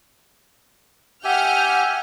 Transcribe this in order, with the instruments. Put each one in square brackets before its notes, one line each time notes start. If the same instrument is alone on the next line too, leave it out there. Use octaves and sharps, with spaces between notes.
[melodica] G4 E5 G#5 [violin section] F#5 F6 G6